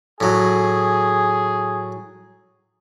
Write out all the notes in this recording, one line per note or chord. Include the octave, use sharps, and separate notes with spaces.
A2 F#3 G#4